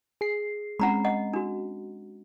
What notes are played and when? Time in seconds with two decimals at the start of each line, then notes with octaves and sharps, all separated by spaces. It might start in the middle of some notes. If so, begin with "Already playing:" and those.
0.21 G#4 C7
0.80 G#3 C4 C#4 F#5 A#5 B5
1.05 D#5 F#5
1.33 D4 F#4